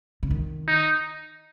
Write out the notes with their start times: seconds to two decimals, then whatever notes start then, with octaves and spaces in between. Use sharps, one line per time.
0.23 C#3
0.31 D#3
0.68 D#4